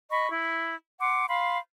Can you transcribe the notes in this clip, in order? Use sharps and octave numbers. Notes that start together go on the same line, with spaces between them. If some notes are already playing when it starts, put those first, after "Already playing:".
D#5 B5 C#6
E4
F#5 C6 D6
F5 B5 C6